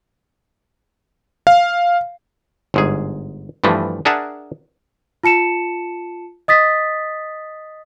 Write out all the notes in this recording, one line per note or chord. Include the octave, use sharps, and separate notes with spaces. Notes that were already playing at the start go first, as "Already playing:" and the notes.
F5
G1 G#2 G#4
G2 E3 F3 A3
D4 G#4 A#4 E5 F#5 A5
F4 A5 C#7 E7
D#5 D#6 A6 B6